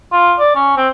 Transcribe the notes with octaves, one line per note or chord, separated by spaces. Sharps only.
F4
D5
C#4
C4